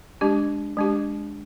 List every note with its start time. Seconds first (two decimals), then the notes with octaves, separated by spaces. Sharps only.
0.21 G#3 D4 G4
0.77 G#3 D4 G4